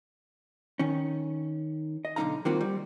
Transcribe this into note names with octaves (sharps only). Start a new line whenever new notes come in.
D#3 C#4
D#5
B1 D3 E3 D#4 F5 A#5
D#3 G3 A#3 C4 F4 F#4
G3